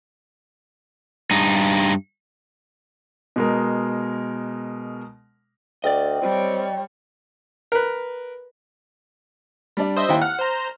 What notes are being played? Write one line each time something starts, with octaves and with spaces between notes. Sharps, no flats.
G2 D#4
B2 G#3 A#4
D2 D5 D#5 G5
G3 C4 C#5
A#4 B4
G3 D4 D5
C5 D#5 E5
D#2 E4 G5
F#5 F6
C5 A#5